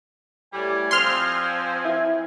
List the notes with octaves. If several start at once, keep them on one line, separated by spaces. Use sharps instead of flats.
A2 G3 G#5
F3 C4 C6 F6
E4